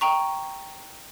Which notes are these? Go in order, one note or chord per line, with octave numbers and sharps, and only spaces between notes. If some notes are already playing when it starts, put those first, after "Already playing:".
G5 A#5 C#6